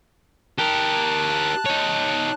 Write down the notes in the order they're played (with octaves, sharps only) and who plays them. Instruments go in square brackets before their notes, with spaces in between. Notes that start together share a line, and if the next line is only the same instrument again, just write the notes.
[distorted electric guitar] G4 A#4 [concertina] A5 F#6
[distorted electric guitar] D#4 C#5